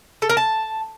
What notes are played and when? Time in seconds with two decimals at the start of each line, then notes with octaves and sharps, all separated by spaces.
0.22 A4
0.29 A#4
0.37 A5